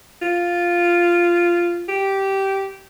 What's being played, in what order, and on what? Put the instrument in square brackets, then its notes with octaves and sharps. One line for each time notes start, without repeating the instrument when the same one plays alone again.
[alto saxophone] F4
G4